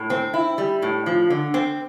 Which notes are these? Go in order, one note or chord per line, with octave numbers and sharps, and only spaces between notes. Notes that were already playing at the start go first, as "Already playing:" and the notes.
Already playing: A2
C4
E4
G3
A2
F3
D3
C4